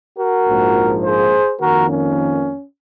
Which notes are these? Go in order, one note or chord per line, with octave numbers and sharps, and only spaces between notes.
F#4 A#4
A#1 G#2 F3 A#3
G#4 C5
F2 D#3 A#3 F#4 A#4
C#4